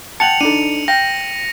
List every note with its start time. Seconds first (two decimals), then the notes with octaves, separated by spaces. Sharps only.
0.20 F#5 G5 A5 C#7 F7 F#7
0.41 D4 D#4 A4 D#7
0.88 F5 G5 A#6